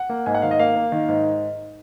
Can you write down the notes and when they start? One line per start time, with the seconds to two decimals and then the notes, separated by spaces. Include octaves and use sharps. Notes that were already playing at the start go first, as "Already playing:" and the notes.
Already playing: F#5
0.09 A#3
0.26 G#2 G#5
0.35 F#5
0.42 D#3 F5
0.51 D#5
0.59 A#3 F5
0.76 A#3
0.92 D#3
1.09 G#2